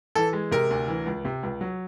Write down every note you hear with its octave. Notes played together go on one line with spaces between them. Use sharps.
E3 A4
G#3
C3 A#4
D2
E3
C#2
C3
C#2
F#3